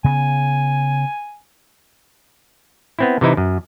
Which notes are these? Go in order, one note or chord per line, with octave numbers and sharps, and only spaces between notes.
C#3 B3 G#5
B3 C4 E4
C3 E3 D#4 E4
F#2